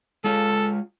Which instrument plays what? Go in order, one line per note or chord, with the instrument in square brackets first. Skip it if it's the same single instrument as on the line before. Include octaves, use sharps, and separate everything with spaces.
[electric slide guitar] G#3 F4 C#5 [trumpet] A4